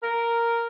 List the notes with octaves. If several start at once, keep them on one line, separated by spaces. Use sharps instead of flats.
A#4